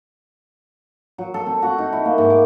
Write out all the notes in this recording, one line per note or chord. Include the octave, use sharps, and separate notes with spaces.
F#3
A4
C4
F#4
D#4
E4
A#3
G#2
D6